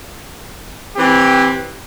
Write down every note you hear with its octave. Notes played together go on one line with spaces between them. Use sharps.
E3 C4 G4